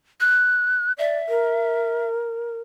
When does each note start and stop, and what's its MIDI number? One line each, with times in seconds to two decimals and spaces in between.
0.20 0.92 90
0.99 1.18 74
0.99 2.08 76
1.29 2.61 70